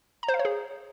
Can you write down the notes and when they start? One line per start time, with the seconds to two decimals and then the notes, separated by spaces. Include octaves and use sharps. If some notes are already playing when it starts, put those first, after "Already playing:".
0.23 A#5
0.28 C5
0.34 F5
0.39 C#5
0.45 G#4